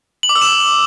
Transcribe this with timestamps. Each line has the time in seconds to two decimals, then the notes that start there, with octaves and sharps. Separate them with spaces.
0.23 F#7
0.29 D6
0.35 E6
0.42 E7